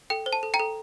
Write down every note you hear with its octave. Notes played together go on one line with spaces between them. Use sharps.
A4 G5
C5
A5
A4
G5 A#5
A4